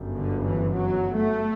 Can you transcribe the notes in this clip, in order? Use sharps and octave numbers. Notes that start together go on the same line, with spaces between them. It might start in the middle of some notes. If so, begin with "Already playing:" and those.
Already playing: G1 F#2 C#3
D3
E3
F#3
A3